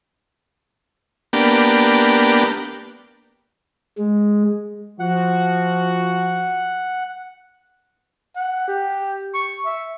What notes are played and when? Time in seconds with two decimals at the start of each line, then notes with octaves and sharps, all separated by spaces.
1.33 A#3 B3 D4 G4
3.98 G#3
5.00 F3 F#4 F#5
8.36 F#5
8.68 G4
9.34 C#6
9.66 E5